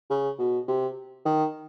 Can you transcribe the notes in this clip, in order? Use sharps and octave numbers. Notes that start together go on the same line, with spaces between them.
C#3
B2
C3
D#3